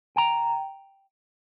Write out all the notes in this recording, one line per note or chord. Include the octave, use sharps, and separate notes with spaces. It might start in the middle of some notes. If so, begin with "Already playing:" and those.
G5 A#5